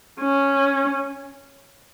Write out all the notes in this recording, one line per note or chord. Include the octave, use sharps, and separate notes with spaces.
C#4